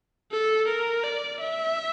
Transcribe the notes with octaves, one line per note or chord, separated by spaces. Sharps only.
A4
A#4
D5
E5